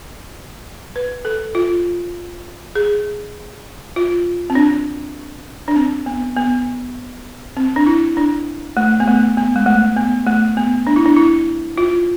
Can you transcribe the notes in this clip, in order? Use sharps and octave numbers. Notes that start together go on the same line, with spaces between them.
B4
A4
F4
G#4
F4
C4
D4
D4
C4
B3
B3
C4
D4
E4
D4
A3
B3
A3
B3
G#3
A3
B3
A3
B3
D4
E4
D4
E4
F4